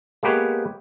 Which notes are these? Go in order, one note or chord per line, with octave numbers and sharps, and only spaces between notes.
G#3 A#3 B3 G4 B4 C#5